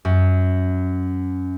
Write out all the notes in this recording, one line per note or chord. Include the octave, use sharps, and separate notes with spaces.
F#2